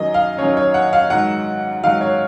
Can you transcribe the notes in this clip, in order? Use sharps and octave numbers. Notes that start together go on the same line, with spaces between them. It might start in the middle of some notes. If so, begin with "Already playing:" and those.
Already playing: F#2 D#3 F#3 D#5
F5
F#2 D#3 F#3 C#5
C#5
F#5
F5
G#2 D#3 F#3 F#5
G#2 D#3 F#3 F5
C#5